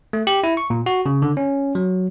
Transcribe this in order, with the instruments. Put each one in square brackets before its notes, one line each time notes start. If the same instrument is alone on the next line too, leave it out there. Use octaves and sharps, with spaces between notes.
[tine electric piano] A3
G4
E4
C#6
A#2
F#4
C#3
D3
C#4
F#3